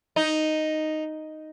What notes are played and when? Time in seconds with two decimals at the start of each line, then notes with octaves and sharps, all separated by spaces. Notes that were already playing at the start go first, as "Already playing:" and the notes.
0.16 D#4